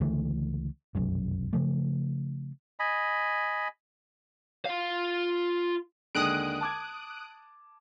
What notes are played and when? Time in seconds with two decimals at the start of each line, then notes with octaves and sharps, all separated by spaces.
0.01 C#2 D3 E3 A3
0.95 F1 B1 F#2
1.53 C#3 F3 A3
2.80 D#5 G#5 B5
4.65 F4 F5
6.15 D#2 D3 G#3 D#6 F#6 D7
6.61 A5 D6 G#6